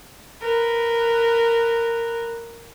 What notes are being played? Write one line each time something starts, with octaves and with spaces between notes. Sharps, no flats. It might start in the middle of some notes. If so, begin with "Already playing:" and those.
A#4 B4